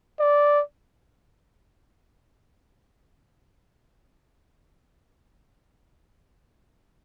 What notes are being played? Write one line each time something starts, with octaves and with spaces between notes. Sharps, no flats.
D5